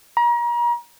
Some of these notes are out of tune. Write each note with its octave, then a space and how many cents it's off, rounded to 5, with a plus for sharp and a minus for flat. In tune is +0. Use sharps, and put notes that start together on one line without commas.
A#5 +35